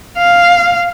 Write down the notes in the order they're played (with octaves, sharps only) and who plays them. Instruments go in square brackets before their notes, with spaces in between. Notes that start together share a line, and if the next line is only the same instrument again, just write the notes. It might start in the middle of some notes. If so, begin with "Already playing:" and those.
[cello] F5